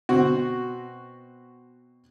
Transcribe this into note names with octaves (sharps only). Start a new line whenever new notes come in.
B2 C4 F#4